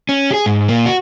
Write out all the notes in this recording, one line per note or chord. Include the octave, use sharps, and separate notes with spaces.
C#4
G4 G#4
G#2
A#2 A#3
F#4